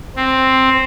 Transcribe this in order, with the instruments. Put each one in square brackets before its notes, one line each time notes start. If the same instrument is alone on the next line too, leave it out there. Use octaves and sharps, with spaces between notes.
[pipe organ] C4